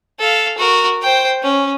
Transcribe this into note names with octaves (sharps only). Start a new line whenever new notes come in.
A4 F5
F#4 A#4
C5 G5
C#4